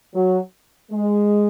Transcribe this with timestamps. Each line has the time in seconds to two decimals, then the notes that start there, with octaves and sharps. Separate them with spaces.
0.14 F#3
0.91 G#3